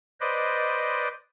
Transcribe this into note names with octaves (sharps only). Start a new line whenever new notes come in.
B4 C5 D5 D#5